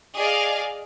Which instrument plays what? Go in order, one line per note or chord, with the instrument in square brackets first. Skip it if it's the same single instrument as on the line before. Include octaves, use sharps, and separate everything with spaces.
[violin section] G#4 D5 D#5 F5